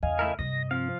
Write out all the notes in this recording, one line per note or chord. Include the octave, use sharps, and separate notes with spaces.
E2 C#3 D#5 F5 G#5
A3 E4 A#4
G2 C3 D#5 A#6
F3 C4 F5